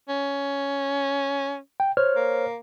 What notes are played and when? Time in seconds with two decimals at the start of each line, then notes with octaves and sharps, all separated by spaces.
0.09 C#4
1.80 G5
1.97 C5 C#5 F6
2.16 A#3